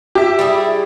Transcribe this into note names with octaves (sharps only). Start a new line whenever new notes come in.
G4 E5
G3 E4 G#4